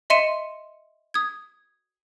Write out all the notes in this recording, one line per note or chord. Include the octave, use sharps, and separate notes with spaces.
D#5 E5 C6 C#7 D#7 E7
D#6 G#6